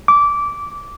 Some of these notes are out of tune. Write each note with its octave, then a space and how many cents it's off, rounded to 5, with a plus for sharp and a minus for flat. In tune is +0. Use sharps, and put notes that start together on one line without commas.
D6 -15